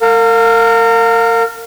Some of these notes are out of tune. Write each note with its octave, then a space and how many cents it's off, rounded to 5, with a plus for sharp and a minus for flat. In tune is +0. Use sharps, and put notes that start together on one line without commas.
A#4 -35 F5 +20